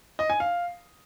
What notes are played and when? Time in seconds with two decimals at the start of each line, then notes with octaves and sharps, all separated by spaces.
0.19 D#5
0.30 G#5
0.40 F5